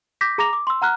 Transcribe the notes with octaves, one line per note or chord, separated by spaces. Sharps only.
D6 G6 A#6 B6
G#4 A#5 D6 A#6 F7
D6
C6 E6
F#5 A#5 F6 F#6